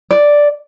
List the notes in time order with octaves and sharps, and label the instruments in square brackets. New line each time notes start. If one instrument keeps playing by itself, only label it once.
[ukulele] D5